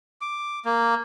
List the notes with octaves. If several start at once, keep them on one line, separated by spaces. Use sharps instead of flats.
D6
A#3